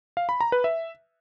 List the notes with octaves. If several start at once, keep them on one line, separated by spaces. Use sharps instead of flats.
F5
B5
A#5
B4
E5